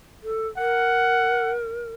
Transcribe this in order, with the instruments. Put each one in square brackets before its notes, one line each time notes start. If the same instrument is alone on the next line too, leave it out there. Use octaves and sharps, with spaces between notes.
[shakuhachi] A4
[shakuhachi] A#4 [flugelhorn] F#5